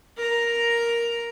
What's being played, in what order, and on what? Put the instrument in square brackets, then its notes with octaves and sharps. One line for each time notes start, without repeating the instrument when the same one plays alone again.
[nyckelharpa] A#4 A#5